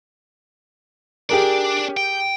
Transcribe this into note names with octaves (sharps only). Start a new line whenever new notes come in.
D4 G4 G#4 A#4 D5
G5